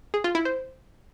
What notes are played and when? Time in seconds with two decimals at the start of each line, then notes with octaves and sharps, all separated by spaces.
0.14 G#4
0.24 F4
0.35 E4
0.45 C5